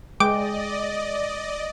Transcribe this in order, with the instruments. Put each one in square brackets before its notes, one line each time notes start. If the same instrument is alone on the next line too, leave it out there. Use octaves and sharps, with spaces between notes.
[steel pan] G#3 G5 [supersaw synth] D5 D#5 [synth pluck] D6